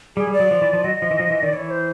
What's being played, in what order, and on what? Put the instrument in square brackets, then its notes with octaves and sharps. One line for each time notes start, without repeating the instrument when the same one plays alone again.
[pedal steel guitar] G3 [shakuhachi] G#4
[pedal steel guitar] G3
[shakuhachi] D5
[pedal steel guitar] F#3
F3
E3
F3
[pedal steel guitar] F#3 [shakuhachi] D#5
[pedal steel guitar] F3
E3
F3
E3
[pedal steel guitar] D#3 [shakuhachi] D5
[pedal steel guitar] E3 [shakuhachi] C#5
[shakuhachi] C5